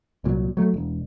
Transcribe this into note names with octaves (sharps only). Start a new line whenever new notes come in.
C2 A#2 F#3
F#3 A3
E1